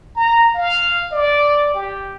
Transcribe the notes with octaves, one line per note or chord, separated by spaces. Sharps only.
A#5
F5
D5
G4